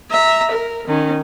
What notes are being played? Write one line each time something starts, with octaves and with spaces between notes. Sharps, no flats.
E5 A#5
A#4
D#3 C#4